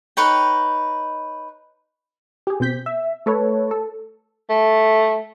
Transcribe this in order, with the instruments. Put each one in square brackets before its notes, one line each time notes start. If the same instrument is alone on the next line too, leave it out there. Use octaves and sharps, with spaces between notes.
[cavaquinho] D#4 B4 C#5 G5
[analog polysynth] G4 G#4
B2 C4 G6 B6
E5
A3 A4 B4 C#5
A4
[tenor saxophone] A3